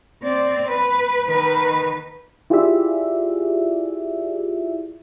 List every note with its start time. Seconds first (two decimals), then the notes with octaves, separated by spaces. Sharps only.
0.23 C4 D5
0.69 B4
1.27 D#3 B4
2.50 E4 F4 G4 G#4 D5 E5